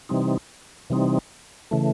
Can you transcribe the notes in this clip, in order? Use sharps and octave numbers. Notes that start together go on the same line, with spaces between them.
C3 E3 G3 C4 D#4
C3 E3 G3 C4 D#4
C#3 E3 A3